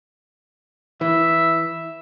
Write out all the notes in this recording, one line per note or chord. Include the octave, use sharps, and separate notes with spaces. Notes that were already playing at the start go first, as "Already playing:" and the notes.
E3 E5